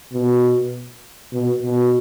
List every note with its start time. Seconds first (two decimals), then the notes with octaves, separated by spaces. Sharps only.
0.13 B2
1.33 B2
1.63 B2